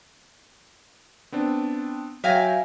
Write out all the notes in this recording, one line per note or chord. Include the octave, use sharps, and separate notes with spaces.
B3 C4 D4
F#3 E4 F5 G5 G#5 A#6